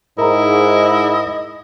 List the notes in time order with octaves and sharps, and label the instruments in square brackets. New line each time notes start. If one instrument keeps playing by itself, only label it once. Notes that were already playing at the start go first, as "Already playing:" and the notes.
[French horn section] G#2 [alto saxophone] E4 [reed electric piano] A#4 A#5 [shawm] D#5